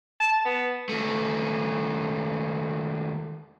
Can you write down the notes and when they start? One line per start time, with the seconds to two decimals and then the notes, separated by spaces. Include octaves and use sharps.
0.20 A5
0.45 B3
0.89 D#2 A3